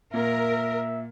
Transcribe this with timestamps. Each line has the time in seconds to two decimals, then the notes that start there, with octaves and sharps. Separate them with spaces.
0.14 A#2 A#4 E5